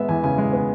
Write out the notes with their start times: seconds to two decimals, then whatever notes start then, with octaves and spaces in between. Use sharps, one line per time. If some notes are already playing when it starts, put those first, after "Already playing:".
Already playing: G#3 B3 E5
0.09 E2 G#5
0.24 C#3 G#5
0.38 G#3
0.53 B3